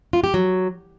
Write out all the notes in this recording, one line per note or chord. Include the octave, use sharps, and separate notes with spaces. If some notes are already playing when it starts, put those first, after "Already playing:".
F4
G4
F#3